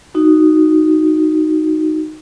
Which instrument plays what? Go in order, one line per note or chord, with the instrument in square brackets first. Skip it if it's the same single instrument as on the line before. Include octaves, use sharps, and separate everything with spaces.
[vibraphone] D#4 F#4